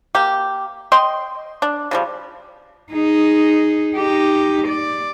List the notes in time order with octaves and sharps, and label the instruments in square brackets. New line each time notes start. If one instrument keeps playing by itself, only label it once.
[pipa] A#3 G4
D#5 G5 C6
D4
C#3 F3 G3
[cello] D#4 G#4
D#4 G4
D5